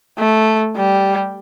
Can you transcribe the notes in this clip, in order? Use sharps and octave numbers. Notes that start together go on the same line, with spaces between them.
A3
G3